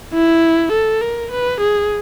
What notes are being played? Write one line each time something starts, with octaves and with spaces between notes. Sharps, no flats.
E4
A4
A#4
B4
G#4